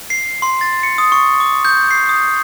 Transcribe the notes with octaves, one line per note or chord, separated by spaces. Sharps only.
C7
C6
A6
C#7
D#6
C#6
D6
G6
C7
D#6